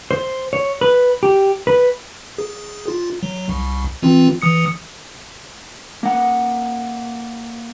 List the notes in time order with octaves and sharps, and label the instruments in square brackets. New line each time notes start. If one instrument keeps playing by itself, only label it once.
[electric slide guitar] C5
C#5
B4
G4
B4
[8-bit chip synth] G#4
F4
F#3
C2
E3 C4 F4
E3 D#6 C#7
[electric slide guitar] A#3 F#5